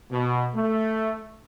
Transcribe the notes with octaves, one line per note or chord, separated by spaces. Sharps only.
B2
A3